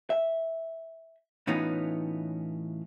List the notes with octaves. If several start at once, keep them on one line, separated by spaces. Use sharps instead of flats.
E5
A2 E3 B3 C#4 D#4 F4